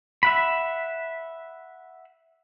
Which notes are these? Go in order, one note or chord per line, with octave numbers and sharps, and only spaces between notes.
E5 F#5 B5